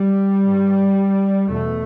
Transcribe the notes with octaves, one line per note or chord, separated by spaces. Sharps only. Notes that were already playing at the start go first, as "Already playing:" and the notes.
Already playing: G3
G2
E2 B2 A3